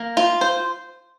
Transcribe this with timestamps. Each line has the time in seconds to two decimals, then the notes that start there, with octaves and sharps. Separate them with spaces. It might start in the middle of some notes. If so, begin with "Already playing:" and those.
Already playing: A#3
0.17 F4
0.41 C5